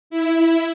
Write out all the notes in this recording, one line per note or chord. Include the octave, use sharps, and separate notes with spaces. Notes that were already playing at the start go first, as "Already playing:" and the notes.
E4